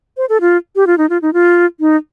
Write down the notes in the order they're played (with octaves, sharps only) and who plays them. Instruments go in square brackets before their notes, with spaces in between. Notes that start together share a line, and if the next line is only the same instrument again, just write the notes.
[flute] C5
A4
F4
G4
F4
D#4
F4
D#4
F4
D#4